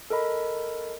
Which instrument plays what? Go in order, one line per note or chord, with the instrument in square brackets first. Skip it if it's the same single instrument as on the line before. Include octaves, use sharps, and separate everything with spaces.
[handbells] A4 A#4 D#5 B5